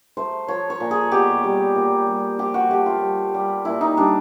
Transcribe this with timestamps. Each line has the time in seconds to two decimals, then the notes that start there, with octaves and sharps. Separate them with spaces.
0.17 A3 C5
0.48 F3 C#5
0.70 C#5
0.80 A#2
0.91 G#4
1.12 B2 G4
1.43 G3
1.75 A#2
2.07 G3
2.39 F3 G4
2.54 F#4
2.70 A3 G4
2.86 F4
3.02 G3
3.34 G3
3.65 A#2 E4
3.81 D#4
3.97 G3 D4